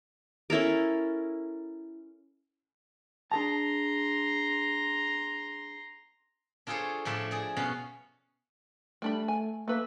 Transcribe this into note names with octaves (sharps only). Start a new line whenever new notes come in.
C#4 E4 A4 A#4
D4 G#4 A5 A#5 C6
D4 F4 G#4 A4 C5 C#5
A2 F3 D4 E5
G#4 D5
B2 C#4 F5 F#5
G3 A3 D4 B5
G#5
A3 A#3 B4 E5